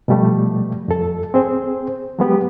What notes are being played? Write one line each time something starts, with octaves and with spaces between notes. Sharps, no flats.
B2 F3 G3 A3
F2 A4
C4 G#4 C5
F#3 G#3 B3 G4